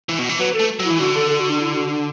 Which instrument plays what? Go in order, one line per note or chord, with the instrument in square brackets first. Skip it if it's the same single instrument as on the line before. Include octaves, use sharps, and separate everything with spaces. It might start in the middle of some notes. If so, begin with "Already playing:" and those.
[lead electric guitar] E3
B2
E3
[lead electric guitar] F#3 [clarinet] B4
[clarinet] A4
[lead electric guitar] A3
F#3
[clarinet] E4
[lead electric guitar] E3
[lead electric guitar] D3 [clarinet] F#4
[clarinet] A4
A4
F#4
D4
E4
F#4
D4